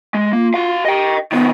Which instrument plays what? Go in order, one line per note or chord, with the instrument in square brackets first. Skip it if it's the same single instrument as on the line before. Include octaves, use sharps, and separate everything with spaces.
[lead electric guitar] G#3
[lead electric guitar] A#3 [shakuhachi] F4
[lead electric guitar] F#4 F5
[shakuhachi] G4 [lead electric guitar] D#5 G5
[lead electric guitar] C3 D#3 [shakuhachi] B3